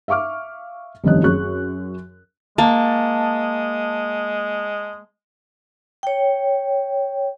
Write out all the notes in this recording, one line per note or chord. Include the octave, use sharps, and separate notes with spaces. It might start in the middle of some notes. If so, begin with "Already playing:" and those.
E5 F5 C#6 D6 F6
F1 G2 D#3 C#4 D#5 F#6
F#2 G#4 C#6 F#6
G#3 A#3 A5
C#5 G5